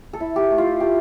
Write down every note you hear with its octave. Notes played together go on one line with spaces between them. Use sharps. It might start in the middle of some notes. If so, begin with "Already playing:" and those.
A4
E4
G4
A3
F4
A3 G4